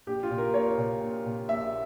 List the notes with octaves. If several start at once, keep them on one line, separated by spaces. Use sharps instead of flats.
A#1 G4
F4
A#2
A#4
A#1 C#5
A#2
A#1
A#2
A#1 E5